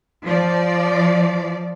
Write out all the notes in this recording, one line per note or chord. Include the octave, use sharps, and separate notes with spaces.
F3 D5